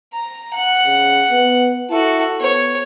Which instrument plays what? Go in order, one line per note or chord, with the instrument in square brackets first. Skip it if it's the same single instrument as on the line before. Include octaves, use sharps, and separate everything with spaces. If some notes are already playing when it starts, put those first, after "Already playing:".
[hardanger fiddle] A#5
F#5
[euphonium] C#3
B3
[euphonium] E4 [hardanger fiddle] F#4 A4
[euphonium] B3 [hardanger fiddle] C#5